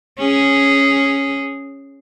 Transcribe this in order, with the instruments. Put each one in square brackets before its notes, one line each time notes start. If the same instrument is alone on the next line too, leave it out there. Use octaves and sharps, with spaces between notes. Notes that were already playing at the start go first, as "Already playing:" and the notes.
[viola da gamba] C#4 G#4